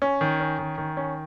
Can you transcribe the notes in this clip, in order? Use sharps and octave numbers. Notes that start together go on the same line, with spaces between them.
C#4
D#3
C#4
D#3
D#3
C#4